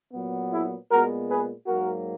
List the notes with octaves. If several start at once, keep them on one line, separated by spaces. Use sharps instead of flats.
A#2 F#3 B3
E4 G#4
A#2 G#3 B3 F#4 A#4
G#4 B4
G#2 F#3 A#3 F#4 A#4